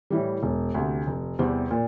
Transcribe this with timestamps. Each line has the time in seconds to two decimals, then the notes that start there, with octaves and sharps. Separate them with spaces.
0.10 A2 E3 G3
0.43 E1
0.74 D2 C3
1.07 F1
1.39 E2 C3 G3 C4
1.71 A#2